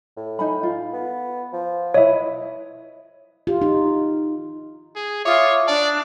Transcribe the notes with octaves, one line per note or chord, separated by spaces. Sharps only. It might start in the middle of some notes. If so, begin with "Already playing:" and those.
A2
D#4 G#5 B5
F4
B3
F3
E4 B4 C#5 D#5 E5
F4 G4
D#4
G#4
F4 C#5 E5 D6 D#6
D4 D5 A5